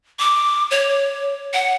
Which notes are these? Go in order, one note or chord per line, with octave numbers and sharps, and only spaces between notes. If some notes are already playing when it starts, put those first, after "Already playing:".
D6
C#5
F#5